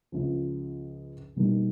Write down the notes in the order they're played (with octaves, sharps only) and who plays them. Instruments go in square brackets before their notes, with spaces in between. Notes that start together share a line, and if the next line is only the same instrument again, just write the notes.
[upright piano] C#2 C#3 F3
B2 G3 A#3 D#4